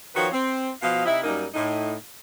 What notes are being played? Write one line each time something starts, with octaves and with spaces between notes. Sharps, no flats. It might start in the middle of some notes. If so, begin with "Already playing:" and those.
D#3 F3 F#4 B4 C#5
C4
B2 F3 D#5 F5
C3 D#4 E4
F#2 G3 A#3 D#4
A2 D#4